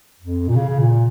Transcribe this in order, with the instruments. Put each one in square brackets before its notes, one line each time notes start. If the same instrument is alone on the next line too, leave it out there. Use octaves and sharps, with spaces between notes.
[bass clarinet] F2
A#2
C#3
C#3
A#2